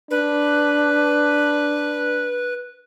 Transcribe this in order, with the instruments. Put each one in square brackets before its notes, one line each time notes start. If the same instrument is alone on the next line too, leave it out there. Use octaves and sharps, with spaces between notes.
[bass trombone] D4 [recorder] B4